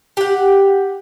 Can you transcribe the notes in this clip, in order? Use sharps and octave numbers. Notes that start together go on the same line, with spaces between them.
G4 F#5